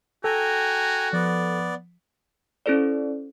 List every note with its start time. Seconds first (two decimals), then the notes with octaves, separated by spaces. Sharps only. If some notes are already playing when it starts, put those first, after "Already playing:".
0.24 F#4 A4 G5 G#5 A#5
1.13 F3 B3 D5
2.66 C#4 E4 A4 C5 D5